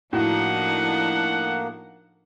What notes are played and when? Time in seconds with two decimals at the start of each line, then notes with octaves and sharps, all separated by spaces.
0.13 A2 F3 A#3 D4 D#4 F#4 F#5